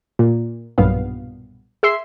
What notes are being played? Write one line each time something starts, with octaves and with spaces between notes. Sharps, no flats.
A#2
B1 G2 A#2 B3 F5
G#4 E5 C6 C7